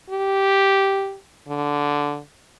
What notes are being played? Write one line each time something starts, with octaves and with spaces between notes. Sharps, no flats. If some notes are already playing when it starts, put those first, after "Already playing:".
G4
D3